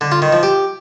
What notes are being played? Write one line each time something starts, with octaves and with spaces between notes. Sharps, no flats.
D3
F4
D#3
F3
G4